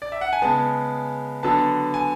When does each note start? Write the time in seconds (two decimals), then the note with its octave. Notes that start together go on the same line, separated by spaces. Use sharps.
0.02 D5
0.12 E5
0.21 F#5
0.33 G#5
0.42 C#3 G#3 B3 A5
1.43 D3 F#3 B3 A5
1.94 G#5